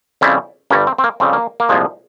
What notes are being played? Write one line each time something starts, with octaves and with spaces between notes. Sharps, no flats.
F2 C#3 G3 C4 E4
G1 G2 G3 A#3 C#4
C4
C4
A#3
F2 C#3 G3 C4
A#3
A#3
C2 A#2 F3 G#3